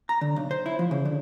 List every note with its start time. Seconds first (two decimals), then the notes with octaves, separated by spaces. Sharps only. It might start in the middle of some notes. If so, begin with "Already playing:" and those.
0.09 A#5
0.21 D3
0.36 B1
0.51 C5
0.66 E4
0.79 F3
0.91 C#3
1.05 D3